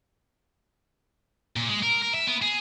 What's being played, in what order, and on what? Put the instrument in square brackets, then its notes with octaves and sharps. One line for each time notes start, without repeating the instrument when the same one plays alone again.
[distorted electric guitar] A#2
G#3
A#4
A#4
E5
B3
G#4